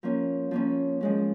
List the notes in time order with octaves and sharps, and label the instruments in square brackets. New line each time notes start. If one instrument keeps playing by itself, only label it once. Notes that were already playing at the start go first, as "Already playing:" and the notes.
[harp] F3 A#3 C#4
F3 A#3 C#4
F3 G#3 C#4